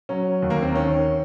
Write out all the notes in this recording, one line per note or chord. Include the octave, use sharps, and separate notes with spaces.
F#3 C#4
D#2
A#3
C4
D#3 C#4